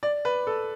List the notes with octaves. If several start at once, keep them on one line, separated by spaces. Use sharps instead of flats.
D5
B4
A4